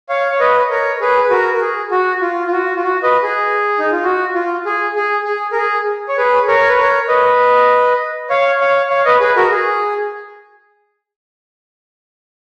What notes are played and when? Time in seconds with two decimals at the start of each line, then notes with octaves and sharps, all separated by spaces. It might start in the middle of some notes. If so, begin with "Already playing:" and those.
0.09 C#5 F5
0.32 C#5
0.40 B4 D#5
0.70 A#4 C#5
1.00 G#4 B4
1.23 B4
1.30 F#4 A#4
1.54 A#4
1.61 G#4
1.91 F#4
2.21 F4
2.47 F4
2.52 F#4
2.76 F4
2.83 F#4
3.03 B4 D#5
3.23 G#4
3.79 D#4
3.92 F4
4.04 F#4
4.35 F4
4.66 G#4
4.96 G#4
5.25 G#4
5.52 A#4
5.56 G#4
6.09 C#5
6.18 G#4 B4
6.47 A#4 C#5
6.69 B4
6.78 A#4 C#5
7.08 B4 D#5
8.30 C#5 F5
8.60 C#5 F5
8.90 C#5 F5
9.05 B4 D#5
9.20 G#4 B4
9.36 F#4 A#4
9.51 G#4